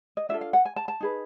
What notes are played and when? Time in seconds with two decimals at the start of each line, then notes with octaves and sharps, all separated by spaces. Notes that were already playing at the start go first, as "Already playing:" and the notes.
0.17 D#5
0.29 D4 F4 A4 E5
0.41 F5
0.53 F#5
0.65 G#5
0.76 A5
0.88 A5
1.00 D#4 G#4 B4